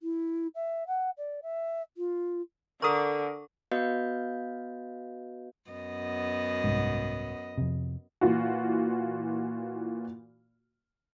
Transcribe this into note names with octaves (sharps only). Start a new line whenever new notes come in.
E4
E5
F#5
D5
E5
F4
D3 A4 A#4 C#6 D#6
B3 F#4 B4 D#5 F5 G6
F#2 B3 D#5
C2 G#2
F2 C3
A#2 E3 F4 F#4